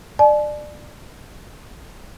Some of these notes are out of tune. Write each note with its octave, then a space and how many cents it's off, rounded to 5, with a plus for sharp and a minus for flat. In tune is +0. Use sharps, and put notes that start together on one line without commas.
D5 +25 A5 -45